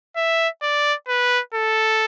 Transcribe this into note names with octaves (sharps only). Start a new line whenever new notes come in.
E5
D5
B4
A4